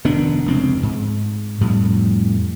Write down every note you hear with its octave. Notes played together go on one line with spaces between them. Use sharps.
F1 D#3 B3 D4
F1 C#2 C4
G#2
F2 A2 G3